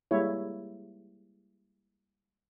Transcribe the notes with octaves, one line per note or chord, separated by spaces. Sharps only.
G3 G#3 A#3 E4 C#5